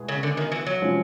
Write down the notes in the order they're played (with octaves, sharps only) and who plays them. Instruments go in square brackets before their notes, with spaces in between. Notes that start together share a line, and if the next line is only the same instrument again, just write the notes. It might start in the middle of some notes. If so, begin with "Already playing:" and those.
Already playing: [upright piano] B2 G#3 B3 E4 G#4
[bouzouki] C#3
D3
D#3
E3
F#3
[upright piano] C3 F3 G#3 C#4